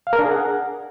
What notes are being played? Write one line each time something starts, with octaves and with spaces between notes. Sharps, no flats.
F5
A#4
D4
G#4
F#5